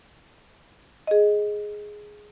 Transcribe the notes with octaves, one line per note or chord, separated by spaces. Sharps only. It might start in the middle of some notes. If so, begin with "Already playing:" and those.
G#4 D#5